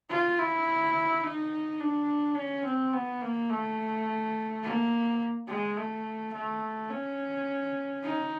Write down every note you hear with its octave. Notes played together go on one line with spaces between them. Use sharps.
F4
E4
D#4
D4
C#4
C4
B3
A#3
A3
A#3
G#3
A3
A3
C#4
D#4